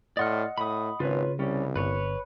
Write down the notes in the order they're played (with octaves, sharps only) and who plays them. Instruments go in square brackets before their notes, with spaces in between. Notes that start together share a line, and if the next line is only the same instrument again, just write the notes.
[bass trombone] A2 [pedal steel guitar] D5 C6 F6 [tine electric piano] D#5 F#5 C#7
[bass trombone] A2 [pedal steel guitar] B5 D#6
[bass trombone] G#1 [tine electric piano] C#3 [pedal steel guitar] F4 B4 C#5
[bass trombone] C2 [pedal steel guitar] G3 C#4
[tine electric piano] G1 [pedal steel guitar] B4 C#5